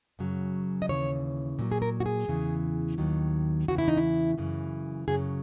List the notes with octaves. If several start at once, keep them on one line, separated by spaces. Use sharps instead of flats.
F#2 C#3 F#3
D#5
D#2 C#3 E3 C#5
A#2 F#3
G#4
A#4
F#4
G#4
E2 C#3 E3
D#2 D#3 F#3
E2 C#3 E3 F#4
E4
D#4
E4
F#2 C#3 E3
F#2 C#3 F#3 G#4